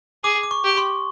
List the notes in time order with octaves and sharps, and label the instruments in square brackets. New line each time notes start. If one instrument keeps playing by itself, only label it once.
[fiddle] G#4 [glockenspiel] D6
[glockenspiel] D6
C#6
[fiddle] G4
[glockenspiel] C6